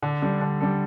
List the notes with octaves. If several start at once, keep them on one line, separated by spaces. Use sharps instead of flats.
D3
G3 D4 A4
D3
G3 D4 A4